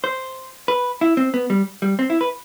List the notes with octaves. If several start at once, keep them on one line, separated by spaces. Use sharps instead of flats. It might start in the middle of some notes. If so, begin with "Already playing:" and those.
C5
B4
E4
C4
B3
G3
G3
C4
E4
B4